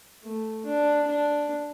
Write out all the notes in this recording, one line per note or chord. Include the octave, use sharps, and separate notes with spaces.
A3
D4
D4